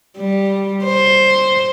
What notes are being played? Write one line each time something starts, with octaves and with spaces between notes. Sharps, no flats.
G3
C5